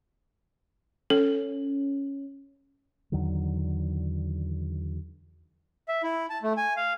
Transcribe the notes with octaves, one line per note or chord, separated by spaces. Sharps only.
C#4 A4
E2 D3 D#3 F#3
E5
E4
A5
A3
G#5
F5